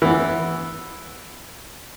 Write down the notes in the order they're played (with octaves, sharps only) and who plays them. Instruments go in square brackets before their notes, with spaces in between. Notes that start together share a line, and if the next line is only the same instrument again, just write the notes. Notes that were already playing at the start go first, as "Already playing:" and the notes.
[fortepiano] E3 B3